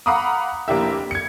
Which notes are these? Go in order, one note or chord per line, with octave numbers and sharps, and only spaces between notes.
F5 F#5 A#5 B5 D6 D#6
F1 A#3 D4 E4 G4 E5
G#6 C#7